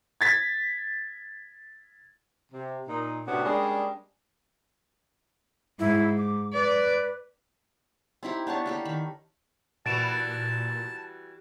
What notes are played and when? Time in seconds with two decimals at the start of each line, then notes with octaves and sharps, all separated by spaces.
0.21 G#6 A6 B6
2.52 C3
2.88 A#2 D#4
3.26 A2 C3 B3 C#4 D4 F#4
3.45 G3 G#3 A#3 C#4 D4 G#4
5.79 G#2 E4
6.17 D6
6.53 B4 D5
8.23 C4 D#4 E4 G4
8.47 B3 D4 C#5 A5
8.66 A#3 G4 A4
8.85 D#3 B5
9.86 A#2 E3 G3 F#4 A5 A6 D7 E7